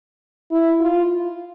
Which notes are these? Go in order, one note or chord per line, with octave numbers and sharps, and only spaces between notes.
E4
F4